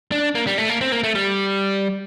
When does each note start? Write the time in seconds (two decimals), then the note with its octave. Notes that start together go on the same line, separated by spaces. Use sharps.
0.12 D4
0.35 A#3
0.47 G3
0.58 A3
0.69 A#3
0.81 C4
0.92 A#3
1.03 A3
1.15 G3